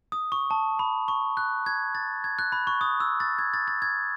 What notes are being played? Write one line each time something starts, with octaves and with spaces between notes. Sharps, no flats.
D#6
C#6
A5
B5
C#6
F#6
G#6
A6
G#6
F#6
B5
C#6
D#6
E6
A6
G#6
A6
A6
G#6